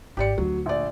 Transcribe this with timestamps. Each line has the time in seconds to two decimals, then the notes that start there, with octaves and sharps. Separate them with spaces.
0.17 G#1 G4 D5 C#7
0.38 D2 F#3
0.66 A#1 D5